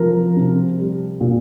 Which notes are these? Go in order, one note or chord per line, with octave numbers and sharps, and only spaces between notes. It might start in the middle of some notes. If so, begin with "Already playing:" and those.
Already playing: C3 F3 A#4
C3
G3
A#2